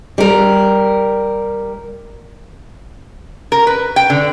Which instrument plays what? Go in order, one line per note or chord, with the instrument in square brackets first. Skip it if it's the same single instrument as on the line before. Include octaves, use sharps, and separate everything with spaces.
[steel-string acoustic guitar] G3 A#4
[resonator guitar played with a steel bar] A#4
B4
G5
D3